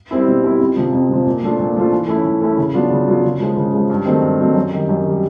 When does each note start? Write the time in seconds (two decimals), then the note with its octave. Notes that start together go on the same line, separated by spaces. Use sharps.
0.11 G3 C4 E4
0.27 B2
0.43 G3 C4 E4
0.59 F2
0.76 C3 F3
0.93 F2
1.09 C3 F3
1.26 A#2
1.42 F3 A3 D4 F4
1.59 A#2
1.76 F3 A3 D4 F4
1.92 E3
2.08 A3 C#4 E4
2.25 E3
2.41 A3 C#4 E4
2.57 C#3
2.74 F#3 B3 D4 F4
2.91 C#3
3.07 F#3 B3 D4 F4
3.23 C#3
3.40 F3 G#3
3.57 C#3
3.73 F3 G#3
3.90 G2
4.06 D#3 F#3 A3 C4
4.22 G2
4.39 D#3 F#3 A3 C4
4.55 F#2
4.72 D#3 G3
4.89 F#2
5.06 D#3 G3